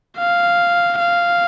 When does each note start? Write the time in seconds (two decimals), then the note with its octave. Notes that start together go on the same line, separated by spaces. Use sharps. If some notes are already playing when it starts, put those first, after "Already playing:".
0.19 F5
1.00 F5